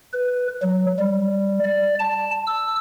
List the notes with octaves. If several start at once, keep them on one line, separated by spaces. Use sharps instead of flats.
B4
F#3
G3
D5
A5
E6